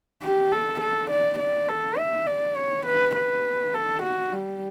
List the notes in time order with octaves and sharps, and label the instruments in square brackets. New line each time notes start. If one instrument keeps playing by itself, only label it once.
[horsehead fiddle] G4
A4
A4
D5
D5
A4
E5
D5
C#5
B4
B4
A4
F#4
G3